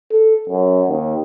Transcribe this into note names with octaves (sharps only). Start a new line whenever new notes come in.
A4
F#2
D#2